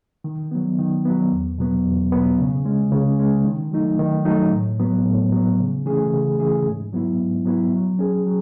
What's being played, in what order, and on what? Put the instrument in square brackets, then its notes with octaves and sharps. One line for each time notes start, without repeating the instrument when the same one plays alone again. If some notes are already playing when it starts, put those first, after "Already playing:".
[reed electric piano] D#3
F#3 B3
D#3
F#3 B3
E2
B2 F#3 B3
E2
B2 F#3 B3
C#3
G#3 C#4
C#3
G#3 C#4
D#3
F#3 A3 D#4
D#3
F#3 A3 D#4
A2
F#3 B3
A2
F#3 B3
C#3
E3 A3 C#4 G#4
C#3
E3 A3 C#4 G#4
G#2
F#3 B3 E4
G#2
F#3 B3 E4
F#3
C#4 G#4
F#3